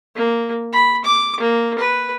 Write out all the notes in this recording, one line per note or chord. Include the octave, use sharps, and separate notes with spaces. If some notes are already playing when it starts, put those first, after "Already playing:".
A#3
B5
D6
A#3
B4